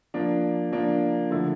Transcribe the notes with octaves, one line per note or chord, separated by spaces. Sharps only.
F3 A#3 D4
F3 A#3 D4
D3 F3 A3 E4